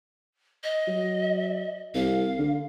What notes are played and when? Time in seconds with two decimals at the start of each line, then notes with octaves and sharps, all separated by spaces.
0.64 D#5
0.88 F#3
1.95 C2 F5
2.39 D3